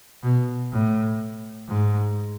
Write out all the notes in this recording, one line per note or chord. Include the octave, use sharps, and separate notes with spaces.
B2
A2
G#2